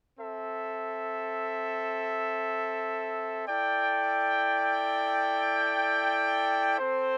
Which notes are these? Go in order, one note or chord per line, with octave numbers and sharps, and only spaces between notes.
C4 A4 E5
E4 A4 D5 G5
C4 A4 C5